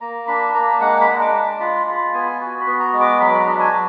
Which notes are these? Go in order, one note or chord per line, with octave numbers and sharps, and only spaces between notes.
A#3 A#5
D4 B5
A#3 A#5
G#3 F#5
B5
D4
D6
G#3
F4 B5
F4 B5
B3 G#5
F#4
B5
B3
A#5
G#3
D6
F#3 B5
B5
A#5
D4
G#5
F#3